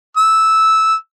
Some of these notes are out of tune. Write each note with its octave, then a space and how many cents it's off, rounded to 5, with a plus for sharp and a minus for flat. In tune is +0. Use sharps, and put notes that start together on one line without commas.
E6 -10